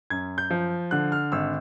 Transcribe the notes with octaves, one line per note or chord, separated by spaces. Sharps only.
F#2 G#6
G6
F3
D3 F#6
F6
G#1 E6